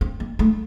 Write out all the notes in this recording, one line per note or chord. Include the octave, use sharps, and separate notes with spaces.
C4
A#3
A3